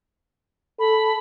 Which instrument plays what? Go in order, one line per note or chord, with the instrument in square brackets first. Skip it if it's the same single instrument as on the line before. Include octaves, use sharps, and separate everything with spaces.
[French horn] A4 [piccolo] B5